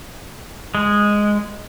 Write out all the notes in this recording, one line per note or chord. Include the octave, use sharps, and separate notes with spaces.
G#3